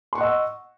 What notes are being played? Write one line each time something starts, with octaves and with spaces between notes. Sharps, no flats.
D#5 F#5 C6 C#6 E6